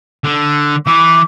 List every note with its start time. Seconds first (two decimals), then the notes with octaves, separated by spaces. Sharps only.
0.24 D3
0.87 E3 E4 D6